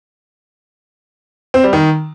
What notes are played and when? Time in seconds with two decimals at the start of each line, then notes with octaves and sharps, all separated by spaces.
1.54 C4
1.63 G3
1.73 D#3